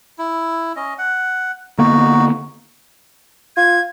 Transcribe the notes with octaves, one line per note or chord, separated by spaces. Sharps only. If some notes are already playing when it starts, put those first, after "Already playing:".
E4
C#4 D#5
F#5
D3 A#3 B3 D#4 F#4
F4 G#6